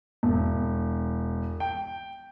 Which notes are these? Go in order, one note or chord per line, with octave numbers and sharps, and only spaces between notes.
E1
G5